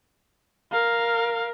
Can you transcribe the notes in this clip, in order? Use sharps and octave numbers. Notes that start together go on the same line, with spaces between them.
A#4 F5